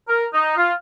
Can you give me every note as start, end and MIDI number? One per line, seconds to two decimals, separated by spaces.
0.09 0.25 70
0.34 0.53 63
0.57 0.73 65